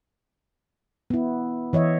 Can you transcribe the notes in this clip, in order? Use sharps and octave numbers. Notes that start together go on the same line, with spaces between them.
B3 E4
E3 C#5 D#5 E5